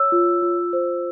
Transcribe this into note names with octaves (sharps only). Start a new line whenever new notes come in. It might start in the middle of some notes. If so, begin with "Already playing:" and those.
Already playing: C#5 E6
F4
F4
C5